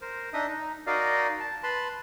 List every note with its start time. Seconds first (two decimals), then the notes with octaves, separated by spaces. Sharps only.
0.01 A#4 C5
0.33 D4 D#4 D#5 E5 D#6
0.48 D#4
0.87 D#4 F#4 A#4 D5 D#5 F5
1.40 A5
1.63 B4 A5 B5 C6